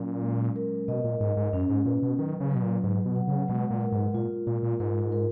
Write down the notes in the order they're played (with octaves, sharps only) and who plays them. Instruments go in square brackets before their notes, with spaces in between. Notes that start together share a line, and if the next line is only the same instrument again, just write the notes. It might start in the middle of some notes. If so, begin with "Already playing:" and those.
Already playing: [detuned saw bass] A#2 [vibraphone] F#3 C#4
[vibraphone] G#3
A#4
[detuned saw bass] B2 [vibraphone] D#5
[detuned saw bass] A#2
[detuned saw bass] G#2 [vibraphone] D#5
[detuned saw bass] G#2
[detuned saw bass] F#2 [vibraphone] C#4
[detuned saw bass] G#2
[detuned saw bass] A#2 [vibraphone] B4
[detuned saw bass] B2
[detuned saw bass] D#3 [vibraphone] F#3
[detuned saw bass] C#3
[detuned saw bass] B2 [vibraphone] F#3
[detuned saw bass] A#2
[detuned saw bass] G#2 [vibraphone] B4
[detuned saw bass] B2
[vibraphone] F#5
[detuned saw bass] C#3
[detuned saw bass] B2 [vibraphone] G#3
[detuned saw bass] A#2
[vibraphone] A#4
[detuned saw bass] G#2
[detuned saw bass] A#2 [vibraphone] F4
[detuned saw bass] A#2 [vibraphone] F4
[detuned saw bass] A#2
[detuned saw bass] G#2 [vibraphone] A#4
[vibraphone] A#4